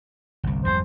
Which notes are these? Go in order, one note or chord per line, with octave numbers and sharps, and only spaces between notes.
G1 C2
G#1 F2 G3 C5